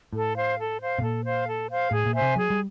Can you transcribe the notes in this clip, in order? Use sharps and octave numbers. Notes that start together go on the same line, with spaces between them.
A2 A4
C5 F5
A4
C5 F5
B2
A#2 A4
C5 F5
A4
C5 F5
A2 G#4
A#2
C5 E5 G#5
C3
F#3 G#4
G3